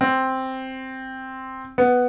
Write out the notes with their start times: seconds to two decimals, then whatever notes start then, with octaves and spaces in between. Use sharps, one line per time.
0.01 C4
1.78 B3